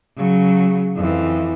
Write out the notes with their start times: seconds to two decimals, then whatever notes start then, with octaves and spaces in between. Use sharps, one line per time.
0.18 C#3 F#3
0.97 F2 E3